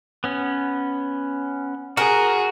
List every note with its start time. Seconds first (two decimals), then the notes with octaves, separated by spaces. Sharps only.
0.24 B3 C#4
1.97 F#4 G#4 A#4